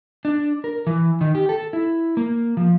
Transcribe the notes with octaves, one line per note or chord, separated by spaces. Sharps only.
D4
A#4
E3
D#3
G4
A4
E4
A#3
F3